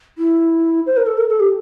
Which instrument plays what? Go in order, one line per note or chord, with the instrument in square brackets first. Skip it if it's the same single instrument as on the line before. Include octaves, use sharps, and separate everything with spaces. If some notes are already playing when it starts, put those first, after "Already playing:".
[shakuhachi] E4
C5
A#4
A4
A#4
A4
G4